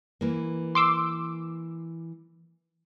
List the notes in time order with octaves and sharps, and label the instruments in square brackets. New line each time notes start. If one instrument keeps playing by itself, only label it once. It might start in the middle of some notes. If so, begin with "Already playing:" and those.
[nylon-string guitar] E3 A#3
[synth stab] C6 D6 E6